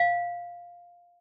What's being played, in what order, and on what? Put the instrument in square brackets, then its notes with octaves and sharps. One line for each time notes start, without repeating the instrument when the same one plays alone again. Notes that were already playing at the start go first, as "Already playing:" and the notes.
Already playing: [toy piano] F5